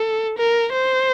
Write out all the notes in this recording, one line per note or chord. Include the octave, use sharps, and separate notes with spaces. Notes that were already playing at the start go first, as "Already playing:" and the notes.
Already playing: A4
A#4
C5